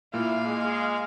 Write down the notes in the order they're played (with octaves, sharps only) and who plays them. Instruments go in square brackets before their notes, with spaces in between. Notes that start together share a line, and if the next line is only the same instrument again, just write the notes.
[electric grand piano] A#2 A#3 [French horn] E4 [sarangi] F5
[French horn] G#3